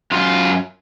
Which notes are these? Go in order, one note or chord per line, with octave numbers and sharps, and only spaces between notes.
F#2 F4